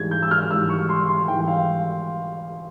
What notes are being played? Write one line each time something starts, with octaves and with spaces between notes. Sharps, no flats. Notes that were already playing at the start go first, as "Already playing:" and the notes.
Already playing: G#2 E3 G3 G#6
G6
E6
F6
G#2 E3 G3 E6
C#6
C6
C6
G#2 E3 G3 G5
G5
F5